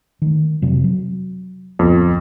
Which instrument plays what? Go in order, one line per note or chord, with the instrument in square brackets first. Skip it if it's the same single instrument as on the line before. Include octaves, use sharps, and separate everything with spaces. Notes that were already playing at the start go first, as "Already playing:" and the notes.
[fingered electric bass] D#3 A3
F2 C3 F#3
F#3
[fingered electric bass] D1 B3 [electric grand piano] F2